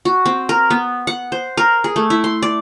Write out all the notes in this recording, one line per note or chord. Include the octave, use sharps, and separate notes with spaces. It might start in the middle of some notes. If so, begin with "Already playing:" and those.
F#4
C4
A#4
B3
F#5
C5
A#4
G#4
A3
E4
C6
D5